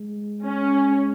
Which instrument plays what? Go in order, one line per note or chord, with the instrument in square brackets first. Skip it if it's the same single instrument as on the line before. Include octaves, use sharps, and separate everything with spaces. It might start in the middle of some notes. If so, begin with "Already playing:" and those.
Already playing: [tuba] G#3
[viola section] C#4